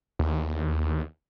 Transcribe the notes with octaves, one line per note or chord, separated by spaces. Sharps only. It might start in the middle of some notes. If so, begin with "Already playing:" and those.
D#2